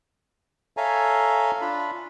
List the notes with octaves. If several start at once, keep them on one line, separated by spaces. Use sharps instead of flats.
A4 C#5 E5 F5 G#5 A#5
D4 F4 B5